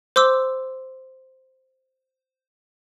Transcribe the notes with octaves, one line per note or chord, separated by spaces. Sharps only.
C5 C6 D6 E6